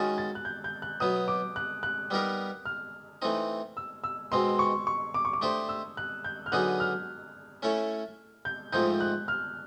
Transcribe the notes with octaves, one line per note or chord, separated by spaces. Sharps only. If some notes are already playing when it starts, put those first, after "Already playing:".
Already playing: D#3 G#3 C#4 F#4 A6
A6
F#6
G6
G6
F#6
B2 F#3 B3 D#6
D6
F#6
F#6
G3 B3 D#4 G4 A#4
F6
E3 A3 C4 D#4
E6
E6
B2 G#3 C4 C6
C#6
C#6
D6
C#6
D6
A3 D4 G4 C5 D#6
E6
F#6
G6
F6
D3 F#3 B3 D#4 G#4 F#6
F6
A3 C#4 E4 A4 C#5
G6
G#2 F3 A3 C4 D#4 G6
F#6
F6